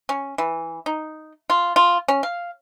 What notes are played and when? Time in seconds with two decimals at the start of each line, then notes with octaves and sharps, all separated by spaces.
0.09 C#4
0.38 E3
0.86 D#4
1.50 F4
1.76 F4
2.08 C#4
2.23 F5